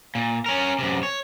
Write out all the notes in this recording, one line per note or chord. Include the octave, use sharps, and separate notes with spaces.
A#2
C#4 A#4
F#2 C3
C#5